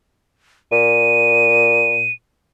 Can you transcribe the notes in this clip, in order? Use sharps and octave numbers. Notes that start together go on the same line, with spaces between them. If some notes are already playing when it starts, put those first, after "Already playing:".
A#2 D#7